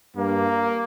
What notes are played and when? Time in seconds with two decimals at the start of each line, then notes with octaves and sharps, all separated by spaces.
0.16 G2 A#3